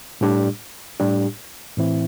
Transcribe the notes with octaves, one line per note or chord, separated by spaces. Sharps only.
A2 G3 D4 G4
A2 G3 D4 G4
A2 E3 C4 E4